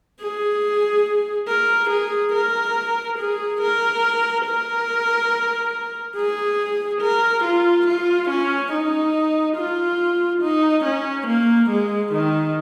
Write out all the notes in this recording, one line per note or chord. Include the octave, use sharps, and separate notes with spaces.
G#4
A#4
G#4
A#4
G#4
A#4
A#4
G#4
A#4
F4
F4
C#4
D#4
F4
D#4
C#4
A#3
G#3
D#3